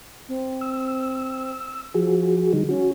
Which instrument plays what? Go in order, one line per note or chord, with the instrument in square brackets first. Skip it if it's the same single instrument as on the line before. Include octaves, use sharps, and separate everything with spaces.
[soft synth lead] C4
[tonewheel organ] E6
[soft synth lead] F3 [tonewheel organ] F#4 G#4
[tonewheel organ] D3 G3 D#4
[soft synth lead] C#4 [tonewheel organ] F#4